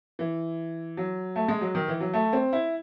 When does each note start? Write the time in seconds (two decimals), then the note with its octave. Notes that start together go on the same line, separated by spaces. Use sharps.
0.19 E3
0.97 F#3
1.36 A3
1.48 G#3
1.61 F#3
1.75 D#3
1.88 E3
2.01 F#3
2.14 A3
2.33 C4
2.53 E4